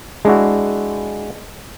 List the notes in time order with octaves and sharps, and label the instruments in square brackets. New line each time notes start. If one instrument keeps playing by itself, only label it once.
[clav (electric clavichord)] G#3 D4 E4 F#4